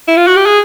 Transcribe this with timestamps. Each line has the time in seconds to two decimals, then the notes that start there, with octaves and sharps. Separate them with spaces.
0.08 E4
0.17 F4
0.27 F#4
0.36 G4
0.46 G#4